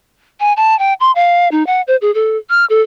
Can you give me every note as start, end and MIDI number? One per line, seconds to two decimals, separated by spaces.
0.40 0.53 80
0.57 0.77 81
0.79 0.93 79
1.00 1.11 84
1.15 1.48 77
1.52 1.66 63
1.67 1.81 78
1.87 1.96 72
2.01 2.13 68
2.14 2.37 69
2.50 2.65 89
2.70 2.81 69